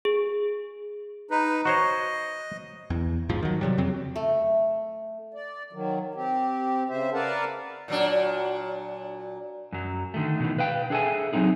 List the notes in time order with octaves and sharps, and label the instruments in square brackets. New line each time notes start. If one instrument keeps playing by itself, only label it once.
[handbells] G#4
[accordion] D#4 B4
[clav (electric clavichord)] F#4 C5 C#5 [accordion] D#5
[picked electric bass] E2
E2 G#2 F3
D#3 F#3
C3 F#3 G3
F2 C#3 F#3 C4
[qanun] A3
[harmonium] D5
D#3 F#3
C4 G4
C#3 C5 E5
A#4 B4 D5 F5 F#5 A5
[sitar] A#2 F#3 D4
[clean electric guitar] F#2 F#3
D3 D#3 A3
B2 D#3 E3
B4 F5 G5
D4 G#4 A4 E5 G#5
F#3 A3 C4 D#4 G#4